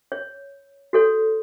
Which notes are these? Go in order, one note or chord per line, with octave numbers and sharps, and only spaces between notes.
C#5
F#4 A4 C#5